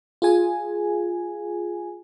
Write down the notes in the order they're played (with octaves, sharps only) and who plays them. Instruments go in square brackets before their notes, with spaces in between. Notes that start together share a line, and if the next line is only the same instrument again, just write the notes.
[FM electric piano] F4 G#4 G#5